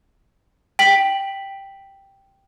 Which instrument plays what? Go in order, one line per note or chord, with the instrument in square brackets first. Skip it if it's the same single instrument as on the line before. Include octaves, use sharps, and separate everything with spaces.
[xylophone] G5 B6 F#7